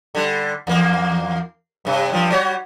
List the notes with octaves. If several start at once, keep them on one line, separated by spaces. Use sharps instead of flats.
D3 G3
E2 A#3
G2 C3
G2 F3
G3 F#4 C#5